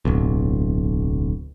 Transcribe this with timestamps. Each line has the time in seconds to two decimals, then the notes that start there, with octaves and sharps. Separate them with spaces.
0.05 D1 B1